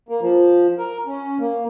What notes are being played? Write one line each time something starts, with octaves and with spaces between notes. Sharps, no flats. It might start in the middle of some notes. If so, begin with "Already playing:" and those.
A#3
F3
A#4
C#4
A#3